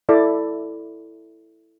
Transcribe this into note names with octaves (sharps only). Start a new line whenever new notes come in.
E4 A4 D5